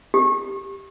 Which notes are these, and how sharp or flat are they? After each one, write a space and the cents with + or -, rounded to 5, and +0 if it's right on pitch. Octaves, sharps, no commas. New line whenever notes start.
G4 +5